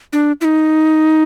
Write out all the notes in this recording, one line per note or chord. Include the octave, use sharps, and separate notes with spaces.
D4
E4
D#4